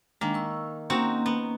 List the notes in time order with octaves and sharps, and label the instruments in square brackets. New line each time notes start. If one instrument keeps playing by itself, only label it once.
[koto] D#3 A#3 [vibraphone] G#3 D4
[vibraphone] C#6 E6
[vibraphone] A#3 C#4 [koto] C4 D#4 F#4
[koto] B3